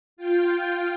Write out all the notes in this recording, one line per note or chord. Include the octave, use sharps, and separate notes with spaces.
F4 G5